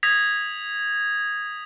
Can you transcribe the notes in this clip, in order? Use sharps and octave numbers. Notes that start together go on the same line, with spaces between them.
D#6 G#6 A#6 B6 F7